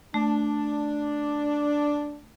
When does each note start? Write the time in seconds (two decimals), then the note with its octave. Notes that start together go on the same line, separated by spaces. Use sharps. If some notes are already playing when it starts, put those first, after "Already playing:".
0.14 A3 D4